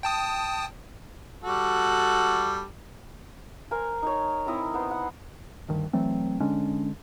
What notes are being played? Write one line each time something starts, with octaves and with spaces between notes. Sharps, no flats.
G5 A5 D#6
G3 F#4 A4
A#4 C5 G#5
D#4 C#5
C4 D#4 E4 D#5
B3 C5
F#5
D2 G2 D#3
E3 F#3 A3 C4
D3 G#3 C#4 D4